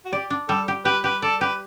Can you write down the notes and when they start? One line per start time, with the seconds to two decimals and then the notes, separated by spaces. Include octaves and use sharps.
0.05 F#4
0.13 G4 D5
0.30 D4
0.48 G3 A4
0.68 G4
0.85 G4 B4
1.04 G4 B4
1.22 A4 D5
1.41 G4 B4